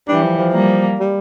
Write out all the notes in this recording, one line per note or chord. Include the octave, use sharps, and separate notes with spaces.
E3 G3 D4
F3
F3
G3 A#3
G3